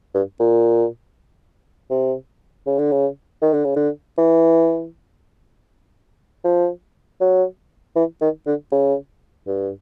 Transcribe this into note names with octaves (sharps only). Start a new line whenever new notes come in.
G2
A#2
C3
C#3
D3
C#3
D#3
D3
C#3
D3
E3
F3
F#3
E3
D#3
D3
C#3
G2